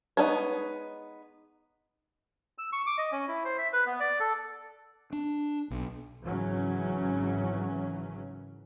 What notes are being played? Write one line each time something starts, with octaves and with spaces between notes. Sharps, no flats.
G#3 B3 D#4 A4 C#5
E6
C#6
D6
D#5
C#4
E4
C5
E5
B4
B3
D5
A4
D4
B1
G#1 C#3 E3 F#3 C#4